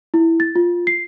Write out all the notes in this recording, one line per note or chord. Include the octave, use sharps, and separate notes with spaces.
E4
A6
F4
C7